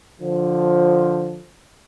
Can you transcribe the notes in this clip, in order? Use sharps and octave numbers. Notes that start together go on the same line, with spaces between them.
D3 F3